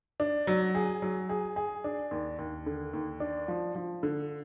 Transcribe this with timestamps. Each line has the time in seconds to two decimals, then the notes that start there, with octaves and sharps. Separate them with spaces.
0.20 D4
0.47 F#3
0.75 G#4
1.02 F#3
1.29 G#4
1.56 G#4
1.84 D4
2.11 D#2
2.39 D#2
2.66 D3
2.94 D#2
3.20 D4
3.48 F3
3.75 F3
4.03 D3